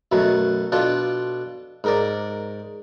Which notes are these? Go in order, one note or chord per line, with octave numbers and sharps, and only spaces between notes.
F#2 B2 F#3 A3
B2 D4 F4 A4
G#2 A#4 D5